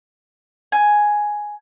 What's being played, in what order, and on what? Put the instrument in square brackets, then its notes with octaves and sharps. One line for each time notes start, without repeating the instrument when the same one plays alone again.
[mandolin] G#5